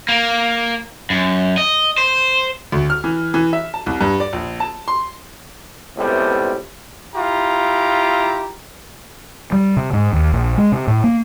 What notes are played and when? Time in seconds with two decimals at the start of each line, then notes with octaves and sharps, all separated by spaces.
0.09 A#3
1.10 F#2
1.58 D#5
1.98 C5
2.72 D2
2.90 F6
3.04 E3
3.34 E3
3.53 E5
3.74 A5
3.86 C2
4.01 G2
4.20 D5
4.33 A#1
4.60 A5
4.88 C6
5.97 C#2 A2 C3 G3 A3 B3
7.15 E4 F4 G4 A#5
9.52 G3
9.77 C3
9.93 G#2
10.13 D#2
10.33 A#1
10.58 G#3
10.72 C3
10.87 A2
11.04 A#3